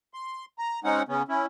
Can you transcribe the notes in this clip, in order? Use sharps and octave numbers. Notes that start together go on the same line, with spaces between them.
C6
A#5
G#3 C4 C#4 D#4 F#5
C#3 B3 C#4
C#4 E4